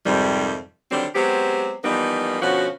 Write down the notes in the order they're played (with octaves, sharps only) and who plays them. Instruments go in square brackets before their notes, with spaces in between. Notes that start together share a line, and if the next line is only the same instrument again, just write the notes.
[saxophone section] F2 G#2 C3 D#3 G3
D3 D#3 F#3 G3 C4
F#3 G#3 B3 C4 G4
E3 F3 G3 A#3 B3 D#4
B2 D3 F3 C#4 F#4